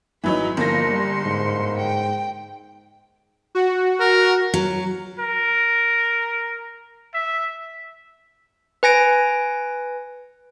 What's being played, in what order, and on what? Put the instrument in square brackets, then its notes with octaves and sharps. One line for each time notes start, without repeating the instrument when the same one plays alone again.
[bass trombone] G#1 [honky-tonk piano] E3 F#3 D#4 [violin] B5
[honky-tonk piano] G1 A#3 A#6 [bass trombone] F3 [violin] C6 C#7
[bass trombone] G3
G#2
[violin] G5
[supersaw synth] F#4
[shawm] A#4
[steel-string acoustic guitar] F#3
[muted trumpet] A#4
E5
[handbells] B4 G#5 A#6 D7